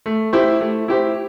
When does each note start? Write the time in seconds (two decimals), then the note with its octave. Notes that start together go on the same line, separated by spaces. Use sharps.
0.06 A3
0.33 E4 G4 C5
0.61 A3
0.88 E4 G4 C5